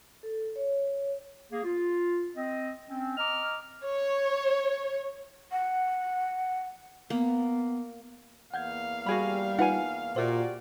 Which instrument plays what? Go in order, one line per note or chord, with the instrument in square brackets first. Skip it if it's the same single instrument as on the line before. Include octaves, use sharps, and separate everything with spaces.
[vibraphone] A4
C#5
[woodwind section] A#3 G#4
F4
C4 D#5
C4 C#4
D#5 A#5 D6 F6
[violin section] C#5
[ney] F#5
[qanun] A#3 [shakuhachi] B3
[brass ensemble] E2 A#3 F5 [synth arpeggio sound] F#5 G6 G#6
[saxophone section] G3 [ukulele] F#4 G#4 B5
[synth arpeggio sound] D#4 F4 B4 [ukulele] F#5 G#5
[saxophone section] A#2 [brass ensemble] F#4 G4 D5 [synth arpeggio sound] C5 E5